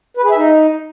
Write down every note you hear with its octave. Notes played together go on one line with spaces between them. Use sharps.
B4
G#4
E5
D#4